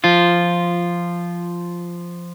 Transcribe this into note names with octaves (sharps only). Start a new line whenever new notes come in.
F3 F4